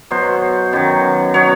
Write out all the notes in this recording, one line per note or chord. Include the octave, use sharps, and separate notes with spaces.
B2 F#3 C5
F#2 D#3 F#3
B2 F#3 C#5